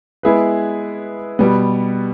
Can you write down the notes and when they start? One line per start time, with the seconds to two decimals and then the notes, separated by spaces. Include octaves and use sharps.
0.23 G#3 B3 E4 G#4 B4
1.39 B2 G3 B3